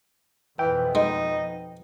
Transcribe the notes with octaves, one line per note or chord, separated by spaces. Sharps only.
F2 B2 E3 B3 G5
G#3 D#4